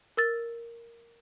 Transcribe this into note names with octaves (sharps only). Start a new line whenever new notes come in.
A#4 E6 A6